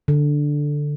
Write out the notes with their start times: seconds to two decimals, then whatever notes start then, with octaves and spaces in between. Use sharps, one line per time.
0.08 D3